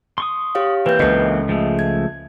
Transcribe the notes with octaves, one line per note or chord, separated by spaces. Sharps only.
C6 C#6 D#6
G4 C#5 F5
E3 A#3 C4 B4 G6
C#2 C#3 A4 D#5
F3 G#3 A3
G#6